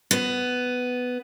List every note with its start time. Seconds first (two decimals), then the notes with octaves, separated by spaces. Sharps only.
0.11 B3